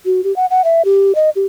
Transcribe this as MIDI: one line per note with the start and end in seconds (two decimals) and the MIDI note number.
0.06 0.23 66
0.24 0.35 67
0.36 0.46 78
0.51 0.64 78
0.64 0.82 76
0.85 1.15 67
1.15 1.30 75
1.36 1.46 67